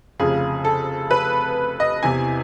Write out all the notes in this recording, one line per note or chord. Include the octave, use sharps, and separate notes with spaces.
F1 F2 C#3 G#4
A4
B4
D#5
E2 C3 E3 G#5